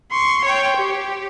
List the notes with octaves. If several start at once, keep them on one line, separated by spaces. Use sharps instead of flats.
C6 C#6
C#5 G5
G4